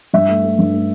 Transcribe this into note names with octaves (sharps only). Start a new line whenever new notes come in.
G2 E5
A3
A3
G2
A3